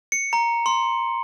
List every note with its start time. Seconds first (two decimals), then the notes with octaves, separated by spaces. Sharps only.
0.12 C#7
0.33 A#5
0.66 C6